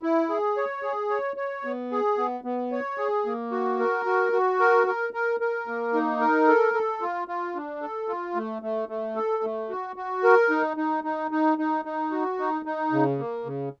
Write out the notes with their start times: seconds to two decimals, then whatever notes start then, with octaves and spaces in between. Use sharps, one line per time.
0.03 E4
0.29 G#4
0.57 C#5
0.83 G#4
1.10 C#5
1.37 C#5
1.65 B3
1.91 G#4
2.18 B3
2.44 B3
2.72 C#5
2.98 G#4
3.26 A#3
3.51 F#4
3.79 A#4
4.06 F#4
4.32 F#4
4.59 A#4
4.87 A#4
5.13 A#4
5.40 A#4
5.68 A#3
5.94 D#4
6.21 A#4
6.47 A4
6.74 A4
7.01 F4
7.28 F4
7.56 D4
7.82 A4
8.08 F4
8.35 A3
8.62 A3
8.89 A3
9.16 A4
9.43 A3
9.69 F#4
9.96 F#4
10.23 A#4
10.50 D#4
10.77 D#4
11.04 D#4
11.31 D#4
11.58 D#4
11.85 D#4
12.11 F#4
12.39 D#4
12.65 D#4
12.92 C#3
13.19 A#3
13.46 C#3